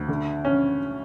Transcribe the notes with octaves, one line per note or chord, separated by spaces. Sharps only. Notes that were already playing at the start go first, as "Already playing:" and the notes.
Already playing: D2
D3
C#4